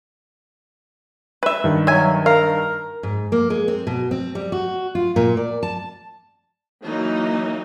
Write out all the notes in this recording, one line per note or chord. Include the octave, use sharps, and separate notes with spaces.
B4 E5
G2 D#3
F#3 E5 G#5
A#4 F5
G#2
A#3
G#3
C4
B2
C4
G3
F#4
F4
A#2
D5
A5
E3 F#3 A#3 D#4